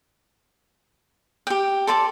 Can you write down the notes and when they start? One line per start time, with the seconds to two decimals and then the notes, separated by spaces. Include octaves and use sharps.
1.47 G4 G5
1.87 A4 C5 D5 A5